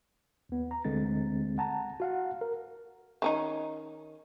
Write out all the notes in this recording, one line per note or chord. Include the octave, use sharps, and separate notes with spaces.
D#2 B3
A#5
D2 D3 G#3 C4 A6
F#5 A5 A#5
F#4 F5 F#5
A#4
D#3 C#4 D#4